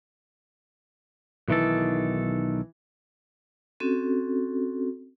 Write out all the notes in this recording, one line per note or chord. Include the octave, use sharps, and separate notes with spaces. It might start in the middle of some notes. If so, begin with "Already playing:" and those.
B1 D#3 E3 A4
C4 C#4 F#4 A4